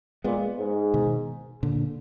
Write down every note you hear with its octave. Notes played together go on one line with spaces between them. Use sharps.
A#2 G#3 B3
G#2
B2 D#3
A#2 D3